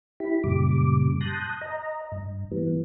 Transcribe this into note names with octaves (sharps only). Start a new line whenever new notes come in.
E4 G4 B5
F#2 A#2 C#3 G3 D6
A5 C6 D#6 F#6 G6 A#6
D#5 A#5
G2
E3 G3 B3